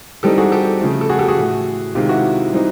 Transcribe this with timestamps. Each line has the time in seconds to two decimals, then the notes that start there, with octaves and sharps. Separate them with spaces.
0.23 E3 G3 C4 D#4 G4 A4
0.38 F#4 G#4
0.52 G4 A4
0.81 C#3 F3 A3
1.01 A4
1.09 F#4 G#4
1.19 G4 A4
1.28 F#4 G#4
1.38 A2 E3 A3
1.95 C3 D#3 G#3 F4 G4
2.09 E4 F#4
2.53 E3 G3 C4 D#4